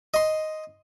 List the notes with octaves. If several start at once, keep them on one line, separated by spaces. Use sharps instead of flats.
D#5 C6